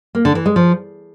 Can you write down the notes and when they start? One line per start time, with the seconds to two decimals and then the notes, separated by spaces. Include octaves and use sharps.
0.15 A#3
0.25 D3
0.35 E3
0.46 G#3
0.56 F3